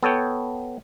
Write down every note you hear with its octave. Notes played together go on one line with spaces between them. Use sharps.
B3 A4 C#5 G5